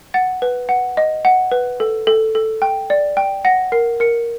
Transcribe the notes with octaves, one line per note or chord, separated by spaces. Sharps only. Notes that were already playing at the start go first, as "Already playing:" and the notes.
F#5 A6
B4
F#5
D#5
F#5
B4
A4
A4
A4
G5
D5
G5
F#5 A#6
A#4 C7
A#4 C#7